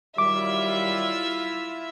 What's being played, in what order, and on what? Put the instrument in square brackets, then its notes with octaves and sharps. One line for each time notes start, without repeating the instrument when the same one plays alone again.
[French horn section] D#3 F#3 G3 [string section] E4 F4 E5 [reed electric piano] D6